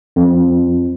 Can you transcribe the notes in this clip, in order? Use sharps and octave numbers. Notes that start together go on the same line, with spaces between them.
F2